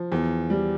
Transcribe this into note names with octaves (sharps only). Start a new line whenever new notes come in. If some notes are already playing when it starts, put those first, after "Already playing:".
Already playing: F3
E2
G3